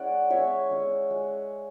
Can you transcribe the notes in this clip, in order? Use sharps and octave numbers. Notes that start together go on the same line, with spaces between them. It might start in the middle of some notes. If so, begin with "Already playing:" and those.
Already playing: G#3 C#4 E4 D5 F#5
G#3 C#4 E4 C#5 E5
G#3 C#4 E4
G#3